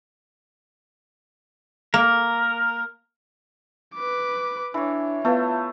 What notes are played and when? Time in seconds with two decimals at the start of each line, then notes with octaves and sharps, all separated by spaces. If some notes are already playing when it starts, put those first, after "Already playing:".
1.94 A#3 A#4
3.95 B4 D6
4.74 E3 D4 C#5
5.25 A3 B3 F4 B4 F5